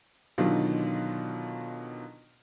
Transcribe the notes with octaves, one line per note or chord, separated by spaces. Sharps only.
B2 D3 D#3 F#3 F4